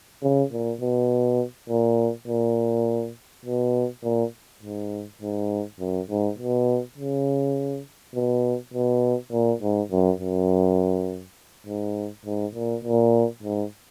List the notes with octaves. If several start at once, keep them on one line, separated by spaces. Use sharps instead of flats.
C#3
A#2
B2
A#2
A#2
B2
A#2
G#2
G#2
F#2
G#2
B2
C#3
B2
B2
A#2
G#2
F#2
F#2
G#2
G#2
A#2
A#2
G#2